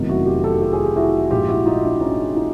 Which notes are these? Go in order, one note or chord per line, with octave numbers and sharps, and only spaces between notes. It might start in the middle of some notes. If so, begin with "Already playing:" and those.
Already playing: F1 E2 C3 D#3 F#3
E4 F#4
F4 G4
G4 A4
F4 G4
G#4
G4
E4 F#4
A#1 G#2 F3 F4 G4
E4 F#4
D#4 F4
D4 E4
C#4 D#4
D#4 F4